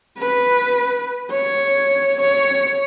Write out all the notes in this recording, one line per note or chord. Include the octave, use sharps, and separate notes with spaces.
B4
C#5
C#5